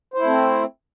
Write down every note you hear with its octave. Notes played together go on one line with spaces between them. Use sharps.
A3 C4 E4 C5